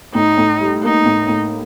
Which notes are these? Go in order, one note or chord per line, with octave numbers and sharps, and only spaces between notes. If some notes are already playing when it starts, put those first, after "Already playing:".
A2 D#4
A2
G3
A#3 D#4
A2
A2